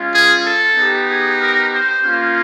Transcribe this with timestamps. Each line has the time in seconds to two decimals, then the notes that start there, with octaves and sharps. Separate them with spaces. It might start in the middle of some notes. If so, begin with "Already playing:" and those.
Already playing: G#3 C#4 F4
0.11 G#4
0.44 A4
0.76 B3 D#4 G4
1.08 G#4
1.40 A#4
1.72 C5
2.05 A#3 C#4 F4